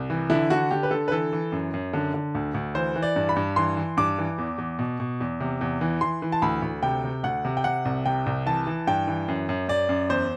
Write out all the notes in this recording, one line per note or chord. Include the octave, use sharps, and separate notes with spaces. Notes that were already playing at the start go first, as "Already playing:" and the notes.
Already playing: C2
E3
D3 E4
D3 F#4
D3 G4
B4
D3 A4
B4
E3 A4
E3
F#2
F#2
D3
D3
D2
D2
E3 C5
E3
D5
G2
B5
G2
E3 C6
E3
G2 D6
E3
E2
E2
B2
B2
E2
C3
E2
E3
E3 C6
E3
A5
D2 B5
D2
C3 G5
C3
D2 F#5
C3
G5
C3 F#5
C2
C3 G5
C2
E3 A5
E3
G2 G5
E3
F#2
F#2
F#2 D5
F#2
E2 C5